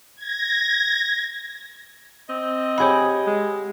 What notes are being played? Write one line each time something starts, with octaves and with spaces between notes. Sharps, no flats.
G#6 A#6
C4 D#5
G4 G#4 C#5 F#5 B5
G#3